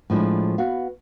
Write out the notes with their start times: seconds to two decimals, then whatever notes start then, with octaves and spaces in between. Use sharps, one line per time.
0.10 A2 F3 G#3 D4 E4
0.58 B3 F#4 F5